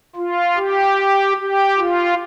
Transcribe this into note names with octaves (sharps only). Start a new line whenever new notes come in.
F4
G4
G4
F4